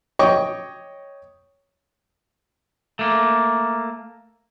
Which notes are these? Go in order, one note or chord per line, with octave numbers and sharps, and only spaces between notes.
C#5 D#5 G5 C#6 D6
A3 A#3